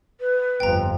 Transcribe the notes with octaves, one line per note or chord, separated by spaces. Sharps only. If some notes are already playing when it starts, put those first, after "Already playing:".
B4
G1 F2 G5 A#5